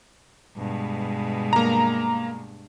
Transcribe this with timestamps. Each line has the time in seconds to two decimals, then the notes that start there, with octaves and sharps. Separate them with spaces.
0.57 G2 B2 G#3
1.53 A#3 A#5